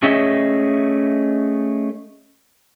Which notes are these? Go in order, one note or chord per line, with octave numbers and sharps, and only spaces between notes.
A3 C#4 G#4 C#5 D#5 E5